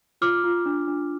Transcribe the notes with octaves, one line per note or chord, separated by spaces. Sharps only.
F4 D6 F6
F4
D4
D4